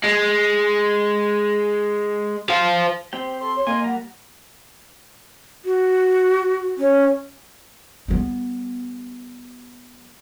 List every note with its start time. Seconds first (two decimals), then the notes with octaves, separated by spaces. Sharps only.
0.04 G#3
2.50 C5 F5
3.13 C4 G4 C5 G5
3.41 A4 C6
3.55 C#5
3.67 A#3 D#5 G#5
3.84 G3 F#5 A#5
5.65 F#4
6.78 C#4
8.08 G3 B3